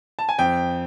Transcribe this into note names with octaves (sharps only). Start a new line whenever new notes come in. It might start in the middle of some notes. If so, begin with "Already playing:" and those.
A5
G#5
F2 G5